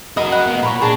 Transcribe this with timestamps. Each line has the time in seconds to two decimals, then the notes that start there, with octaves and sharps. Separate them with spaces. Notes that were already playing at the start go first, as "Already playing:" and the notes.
0.17 F#4 A#4 D#5 B5 D#6
0.32 F#5
0.47 A#3 B3
0.63 A#2 C#5 A#5 B5
0.82 D4 G#4 A5 A#5